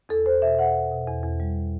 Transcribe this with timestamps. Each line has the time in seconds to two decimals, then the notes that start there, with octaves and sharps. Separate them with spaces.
0.09 E2 A4
0.25 E2 C5
0.42 B2 E5
0.59 E2 F#5
0.75 E2
0.91 B2
1.08 E2
1.23 E2
1.40 G3